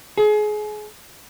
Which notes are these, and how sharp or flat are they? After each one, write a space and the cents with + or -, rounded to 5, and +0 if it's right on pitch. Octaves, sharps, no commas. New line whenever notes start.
G#4 +30